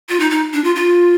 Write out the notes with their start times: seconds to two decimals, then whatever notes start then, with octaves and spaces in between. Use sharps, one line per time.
0.09 F4
0.20 D#4
0.31 D#4
0.53 D4
0.64 F4
0.75 F4